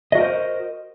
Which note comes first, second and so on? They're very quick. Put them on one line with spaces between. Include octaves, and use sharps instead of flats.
D#5 F#4 A#4 C5